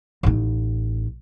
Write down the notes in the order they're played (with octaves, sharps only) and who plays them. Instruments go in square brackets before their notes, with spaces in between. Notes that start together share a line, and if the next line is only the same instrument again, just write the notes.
[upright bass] A1 D#4